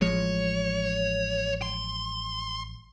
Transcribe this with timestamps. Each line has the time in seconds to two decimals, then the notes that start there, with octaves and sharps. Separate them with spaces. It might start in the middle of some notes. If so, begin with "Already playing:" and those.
0.02 A1 F3 G#3 C#5
1.62 C6